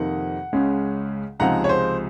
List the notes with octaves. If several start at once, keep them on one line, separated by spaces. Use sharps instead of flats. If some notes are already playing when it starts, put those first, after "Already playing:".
Already playing: F2 C3 D#3 A#3 D#4 F#5
C#2 C#3 G#3 C#4
C#2 C3 F3 G#3 D#4 F#5 A#5
C#5
C5